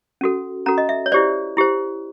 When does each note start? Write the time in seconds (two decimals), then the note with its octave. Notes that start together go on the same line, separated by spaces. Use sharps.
0.21 C#4 F#4 A4
0.66 C#4 F#4 A4 A#5
0.78 D#5
0.89 E5
1.06 C#5
1.12 E4 G4 C5 D5
1.57 E4 G4 C5